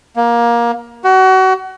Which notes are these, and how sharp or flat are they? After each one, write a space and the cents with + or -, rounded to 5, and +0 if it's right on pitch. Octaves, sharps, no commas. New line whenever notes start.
A#3 +20
F#4 +30